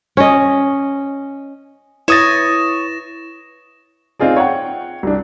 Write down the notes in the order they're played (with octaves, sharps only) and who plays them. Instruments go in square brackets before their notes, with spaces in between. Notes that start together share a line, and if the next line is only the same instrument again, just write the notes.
[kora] C#4 D#5
[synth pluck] E4 B4 [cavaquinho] C#5 [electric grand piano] C#6 D#6 A6 [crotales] A#6 E7
[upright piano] C4 D#4 F4 G#4 D5
C#5 F#5 G5
C2 D4